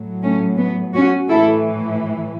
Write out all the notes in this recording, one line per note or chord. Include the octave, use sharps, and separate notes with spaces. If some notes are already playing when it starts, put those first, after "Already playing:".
Already playing: A2 F#3
A3 C#4
B3
C#4 F#4
A2 E3 E4 A4